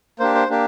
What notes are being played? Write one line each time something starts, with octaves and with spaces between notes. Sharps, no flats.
A#3 D4 G4 C5
C5
A#3 D4 G4